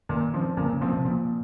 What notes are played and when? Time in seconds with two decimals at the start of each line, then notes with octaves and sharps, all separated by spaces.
0.09 A#2 D#3
0.34 F3 C4
0.57 A#2 C#3
0.69 C#3
0.81 A#2 F3 C4
0.93 C3
1.05 A#2 F3